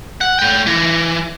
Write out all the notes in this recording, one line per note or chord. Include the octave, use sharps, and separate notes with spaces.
F#5
A3 G5
E3